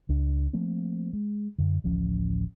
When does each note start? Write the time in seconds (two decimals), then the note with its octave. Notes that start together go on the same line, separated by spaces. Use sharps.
0.09 C#2 D4
0.53 F3 A3 A#3 C4
1.13 G#3
1.58 F#2 D3
1.84 D1 A1 F3 C#4